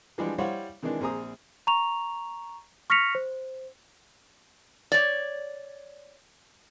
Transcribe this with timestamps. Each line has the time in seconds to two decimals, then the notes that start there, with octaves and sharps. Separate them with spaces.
0.18 E3 F3 G3 G#3 D4 F4
0.38 G3 E4 C5 C#5 F5 F#5
0.83 C3 D#3 E3 G#3 D4
1.00 A#1 C4 G#4 A#5 D#6
1.67 A#5 C#6 F7
2.90 C#6 F6 A#6 B6 C#7 F7
3.15 C5
4.92 C#5 D5